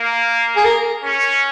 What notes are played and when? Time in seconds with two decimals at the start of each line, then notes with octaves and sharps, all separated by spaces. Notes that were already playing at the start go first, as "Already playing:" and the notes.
Already playing: A#3
0.57 G#4
0.65 A#4
1.04 C#4